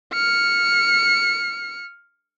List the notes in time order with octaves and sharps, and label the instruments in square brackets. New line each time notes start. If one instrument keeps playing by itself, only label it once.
[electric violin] F6 C#7